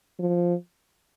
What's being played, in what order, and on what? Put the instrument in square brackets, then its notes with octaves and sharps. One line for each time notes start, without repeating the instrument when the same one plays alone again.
[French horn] F3